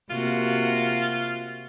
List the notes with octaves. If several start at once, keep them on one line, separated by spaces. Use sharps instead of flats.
C3 A#3 F4 F#4